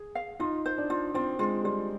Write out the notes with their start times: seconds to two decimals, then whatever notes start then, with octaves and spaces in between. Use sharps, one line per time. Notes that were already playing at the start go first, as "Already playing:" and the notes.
Already playing: G#4
0.15 F5
0.40 D#4 F4
0.66 C5
0.78 D4
0.90 F4
1.14 C4 F4
1.39 G#3 F4
1.64 G3 F4